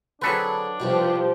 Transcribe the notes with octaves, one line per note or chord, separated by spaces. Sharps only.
D3 F#3 C4 D4 G#4 A4 B4
C2 G2 B2 F3 G4